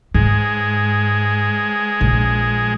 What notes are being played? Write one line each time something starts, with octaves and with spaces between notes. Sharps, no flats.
G#2 G#3
A#1